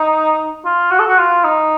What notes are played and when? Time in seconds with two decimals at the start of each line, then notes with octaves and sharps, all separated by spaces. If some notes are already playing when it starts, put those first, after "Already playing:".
Already playing: D#4
0.65 F4
0.91 F#4
0.99 A4
1.07 F#4
1.18 F4
1.44 D#4